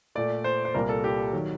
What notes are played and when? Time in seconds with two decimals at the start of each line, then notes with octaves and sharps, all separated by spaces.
0.15 A#2 A3 D5
0.44 C5
0.65 C5
0.74 C2 A#2 G3 A#3 A#4
0.89 A4
1.04 G4
1.33 D#3 F#3